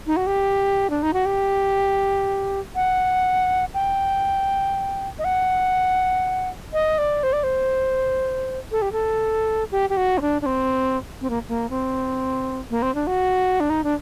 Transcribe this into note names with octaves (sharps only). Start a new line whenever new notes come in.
D#4
F#4
G4
D4
D#4
F#4
G4
F#5
G5
D#5
F#5
D#5
D5
C5
D5
C5
A4
G4
A4
G4
G4
F#4
C4
D4
D4
C4
C4
A#3
A#3
C4
A#3
C4
D4
F#4
D4
D#4
D4